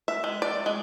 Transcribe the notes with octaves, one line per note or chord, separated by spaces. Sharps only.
E5
G#3
D5
G#3